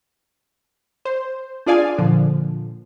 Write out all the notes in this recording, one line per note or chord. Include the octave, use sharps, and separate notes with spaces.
C5
D4 F4 G#4 D5 F5 G#5
A#2 D3 F3